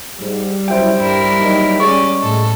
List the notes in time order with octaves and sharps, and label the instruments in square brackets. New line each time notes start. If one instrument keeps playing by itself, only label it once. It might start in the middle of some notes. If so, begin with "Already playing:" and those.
[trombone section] G#2 [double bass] G3
[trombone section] F#2 F#3 E4 [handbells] C5 G5
[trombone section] G2 [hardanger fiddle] E4 A#4
[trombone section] F#3 A#3 D#4
[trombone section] G#3 [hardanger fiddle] C#4 D5 [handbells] C#6
[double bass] A2 [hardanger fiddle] A4